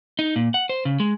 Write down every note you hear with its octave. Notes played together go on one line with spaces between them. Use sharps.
D#4
A#2
F#5
C5
C#3
G#3